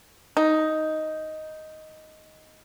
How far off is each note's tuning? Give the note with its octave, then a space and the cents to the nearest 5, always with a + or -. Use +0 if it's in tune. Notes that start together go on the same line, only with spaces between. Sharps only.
D#4 +5